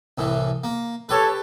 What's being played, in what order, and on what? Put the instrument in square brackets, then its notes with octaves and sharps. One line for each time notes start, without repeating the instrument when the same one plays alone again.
[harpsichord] C2 A2 E3
A#3
[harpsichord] G4 B4 [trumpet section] A4 C#5